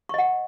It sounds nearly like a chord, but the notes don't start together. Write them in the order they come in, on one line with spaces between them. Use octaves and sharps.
C#6 D#5 F#5